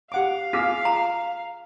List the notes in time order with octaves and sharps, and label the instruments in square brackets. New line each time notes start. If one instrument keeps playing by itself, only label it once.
[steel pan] G4 F#5 D6 [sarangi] F5
[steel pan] F4 G#4 E6 [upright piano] D6 F6 B6
[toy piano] A#5